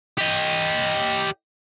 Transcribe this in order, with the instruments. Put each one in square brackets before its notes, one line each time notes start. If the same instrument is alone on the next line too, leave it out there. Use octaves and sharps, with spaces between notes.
[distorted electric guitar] G4 D#5